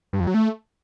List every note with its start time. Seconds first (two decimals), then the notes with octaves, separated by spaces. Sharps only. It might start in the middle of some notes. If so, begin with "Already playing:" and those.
0.13 G2
0.20 F2
0.27 F#3
0.34 A3